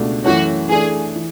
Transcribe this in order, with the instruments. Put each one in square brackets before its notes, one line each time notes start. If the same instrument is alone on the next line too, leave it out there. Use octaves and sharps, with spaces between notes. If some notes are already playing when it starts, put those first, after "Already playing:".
Already playing: [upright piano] C#2 B2 A3 D4
[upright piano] F#2 E3 A3 C#4 [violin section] F#4
[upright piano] E3 A3 D4 [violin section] G#4
[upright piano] E3